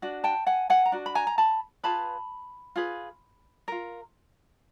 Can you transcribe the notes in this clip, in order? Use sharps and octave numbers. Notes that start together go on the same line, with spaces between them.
D4 F#4
G5 A5
F#5 G#5
F#5 G#5
A#5
D4 F#4
B5
G#5 A#5
A#5
A5 B5
F4 G#4 B4 A5 B5
F4 G#4 B4
F4 A#4